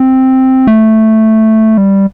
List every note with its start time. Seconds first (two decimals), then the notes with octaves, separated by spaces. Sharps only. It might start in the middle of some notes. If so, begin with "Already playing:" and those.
Already playing: C4
0.67 A3
1.78 G3